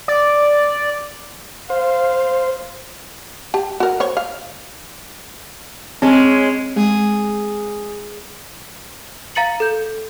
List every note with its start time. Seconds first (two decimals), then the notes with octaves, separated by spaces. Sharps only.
0.08 D5
1.70 C5 F5
3.54 G4 A5
3.80 F#4 A#4
4.00 C5 C#5
4.17 F5
6.02 G#3 C4 C#4
6.76 G#3 G#4
9.35 F5 A#5 A6 C#7 F#7
9.60 A4 G6